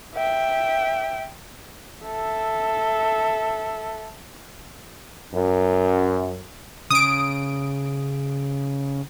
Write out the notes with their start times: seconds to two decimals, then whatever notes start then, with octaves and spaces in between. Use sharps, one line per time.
0.14 E5 G5
2.05 A4 E5
5.34 F#2
6.90 C#3 D#6 D7